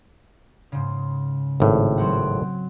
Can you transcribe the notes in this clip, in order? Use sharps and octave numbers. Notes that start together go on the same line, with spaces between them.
G#2 C#3
G#1 A2
F#3 C4 F#5